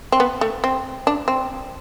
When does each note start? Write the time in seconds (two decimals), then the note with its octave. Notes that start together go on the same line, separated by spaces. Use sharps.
0.12 C4
0.20 B3
0.41 A3
0.64 C4
1.07 D4
1.28 C4